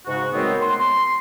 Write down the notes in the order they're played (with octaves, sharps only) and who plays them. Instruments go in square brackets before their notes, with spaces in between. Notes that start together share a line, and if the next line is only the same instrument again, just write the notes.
[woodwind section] G#2 C#3 F#4
D#3 F#3 G#3 A3 B3 C4
C6